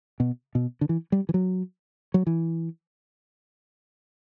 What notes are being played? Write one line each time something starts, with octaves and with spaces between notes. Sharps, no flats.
B2
B2
D3
E3
G3
E3
F#3
F#3
E3